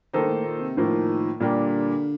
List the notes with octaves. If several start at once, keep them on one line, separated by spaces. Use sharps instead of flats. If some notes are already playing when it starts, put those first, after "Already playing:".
A#2 D#3 A#3 D#4 A4 C5
G2
A2
A#2
C3
A2 D#3 F3 A#3
A#2 D3 G3 A#3 D4 G4